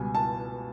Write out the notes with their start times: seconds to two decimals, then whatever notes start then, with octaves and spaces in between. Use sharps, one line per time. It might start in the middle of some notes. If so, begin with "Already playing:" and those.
Already playing: C#2 B2 G3 G#5
0.15 A5